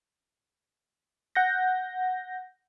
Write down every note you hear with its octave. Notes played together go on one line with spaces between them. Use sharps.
F#5 G6 A#6